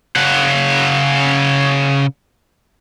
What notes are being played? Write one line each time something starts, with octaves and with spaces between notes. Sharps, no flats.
C#3 F#5